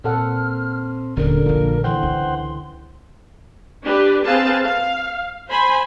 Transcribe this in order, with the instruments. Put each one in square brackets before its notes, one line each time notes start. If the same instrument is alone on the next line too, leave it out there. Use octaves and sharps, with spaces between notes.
[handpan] A#2 A4 F#5 [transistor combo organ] C4 [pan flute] F6
[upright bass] D#1 C#4 [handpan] D3 [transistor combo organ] A#3 [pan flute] A#4
[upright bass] A#1 E4 [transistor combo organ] F3 A#3
[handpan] E3 [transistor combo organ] C5 F#5 G5 [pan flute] C6
[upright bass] C#2
[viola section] D4 G4 B4
C4 G#4 B4 F5 A5
F5
C5 G#5 B5